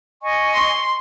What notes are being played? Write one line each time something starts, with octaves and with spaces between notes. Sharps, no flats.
D#5 G#5 C#6
C6